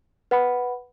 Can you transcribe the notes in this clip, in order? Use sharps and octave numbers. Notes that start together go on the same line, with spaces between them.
B4 F#5 B5